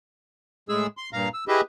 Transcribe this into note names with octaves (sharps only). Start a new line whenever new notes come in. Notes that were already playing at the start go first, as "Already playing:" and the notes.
A2 G#3 G#4 E6
C6
G2 A#2 F5 A#5
E6
E4 G4 G#4 B4 D#5 E5